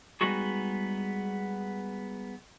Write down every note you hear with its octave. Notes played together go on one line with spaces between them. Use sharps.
G3 G#3 B3 D#4 F#4 G#4